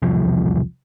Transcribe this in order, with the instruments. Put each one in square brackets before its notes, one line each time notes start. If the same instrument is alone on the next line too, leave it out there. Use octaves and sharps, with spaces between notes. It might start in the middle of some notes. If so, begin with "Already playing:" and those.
[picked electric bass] E1 C2 F3